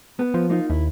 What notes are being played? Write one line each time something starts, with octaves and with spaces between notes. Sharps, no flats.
B3
F3
A#3 D#4 F4
D#2 E4